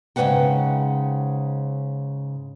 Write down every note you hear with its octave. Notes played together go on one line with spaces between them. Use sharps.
G#2 C#3 F#3 B4 F#5 G5